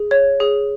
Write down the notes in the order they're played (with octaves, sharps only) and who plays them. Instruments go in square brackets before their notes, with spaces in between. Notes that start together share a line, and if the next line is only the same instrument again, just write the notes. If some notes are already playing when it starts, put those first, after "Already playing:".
Already playing: [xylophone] G#4
C#5
G#4